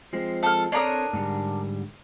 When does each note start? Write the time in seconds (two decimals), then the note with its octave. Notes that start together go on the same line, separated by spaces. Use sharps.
0.13 F3 G#3 C4
0.43 A4 F6
0.72 C4 D4 A4 A#4 C#5 D#6
1.13 G#2 D3 G3